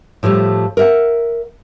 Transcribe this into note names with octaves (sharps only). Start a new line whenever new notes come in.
A2 F3 G3 A3
A#4 E5 F#5